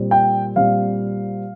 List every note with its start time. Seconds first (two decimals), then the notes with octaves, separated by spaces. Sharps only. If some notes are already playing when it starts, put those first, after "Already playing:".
Already playing: A#2 G3 C4
0.11 G5
0.56 A#2 G3 C4 F5